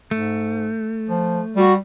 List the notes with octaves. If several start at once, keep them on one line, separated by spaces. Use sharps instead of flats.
G#2 A3
F3
G3 F#4